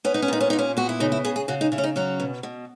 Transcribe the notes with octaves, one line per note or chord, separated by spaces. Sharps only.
B3 C#4
D#4
C#4
A#2 D#4
C#4
A#2 D#4
C#4
B3 F#4
E4
C#3 D#4
E4
C#3 G#4
G#4
C#3 F#4
D#4
C#3 E4
C#4
D#4
F#3 C#4
B2
B2